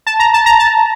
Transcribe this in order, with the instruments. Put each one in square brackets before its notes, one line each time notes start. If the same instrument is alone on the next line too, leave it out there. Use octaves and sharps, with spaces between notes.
[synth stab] A5
A#5
A5
A#5
A5